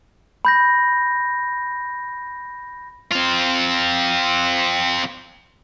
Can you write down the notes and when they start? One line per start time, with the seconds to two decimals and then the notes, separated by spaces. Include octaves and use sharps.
0.45 B5 G6 A#6
3.11 C4 F4